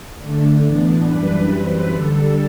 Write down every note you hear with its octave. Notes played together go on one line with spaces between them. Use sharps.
D3 A3 D4
A2 E3 B3 D4
F#2 E3 G3 D4 B4
F#2 E3 G3 C4
D3 G3 D4 A4